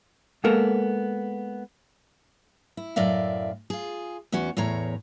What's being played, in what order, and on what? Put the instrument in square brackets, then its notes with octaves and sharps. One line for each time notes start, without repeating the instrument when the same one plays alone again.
[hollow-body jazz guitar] G#3 A#3 B3 A4 A#4
[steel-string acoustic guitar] E4
F#2 A2 D5 E5 F5
F4 G#4
E2 B3 C#4 F#4
E2 A2 C#5 A#5